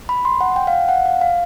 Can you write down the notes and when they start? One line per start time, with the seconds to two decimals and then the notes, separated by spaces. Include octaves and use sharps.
0.09 B5
0.25 C6
0.41 F#5
0.56 G5
0.67 F5
0.73 F#5
0.89 F#5
1.06 F5
1.21 F5